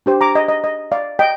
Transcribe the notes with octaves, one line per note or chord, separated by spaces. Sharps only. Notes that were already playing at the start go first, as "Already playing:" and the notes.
D4 G4 C5
A#5 D6
D#5
D#5
D#5
D5 F5
D#5 G5